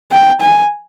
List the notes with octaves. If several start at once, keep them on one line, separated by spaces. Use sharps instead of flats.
G5
G#5